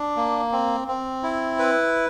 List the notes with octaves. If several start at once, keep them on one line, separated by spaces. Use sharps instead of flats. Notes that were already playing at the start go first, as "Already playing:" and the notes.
Already playing: D4
A#3
C4
C4
E4
B4